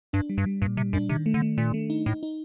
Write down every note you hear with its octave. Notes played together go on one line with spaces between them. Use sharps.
G2 D4
G3
G2
G3
G2 A#2
C3 G3
F#2 D4
C3 D#3
A3
D3
A3
A#2 A3
A3
D#4
A2 D#4
D#4